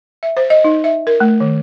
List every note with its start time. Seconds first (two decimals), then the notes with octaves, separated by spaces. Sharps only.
0.23 E5
0.37 C5
0.50 D#5
0.64 D#4
0.84 E5
1.07 A#4
1.20 A3
1.40 D#3